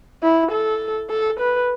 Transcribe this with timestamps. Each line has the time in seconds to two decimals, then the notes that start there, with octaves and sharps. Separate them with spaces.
0.23 E4
0.51 A4
1.10 A4
1.40 B4